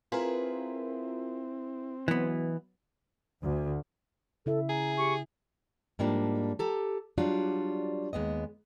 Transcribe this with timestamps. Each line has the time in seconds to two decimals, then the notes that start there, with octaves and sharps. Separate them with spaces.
0.12 C4 E4 F4 G#4 A#4 B4
2.08 B2 E3 F#3 B3
3.41 D2
4.46 C#3 E4 A4 E5
4.69 G#4 A#5
4.98 G4 C#6
5.99 G#2 F3 G3 A#3 D4
6.59 G4 A4 A#5
7.18 F#3 G3 D4 F4 F#4 D5
8.13 D#2 G#3 B3 D#5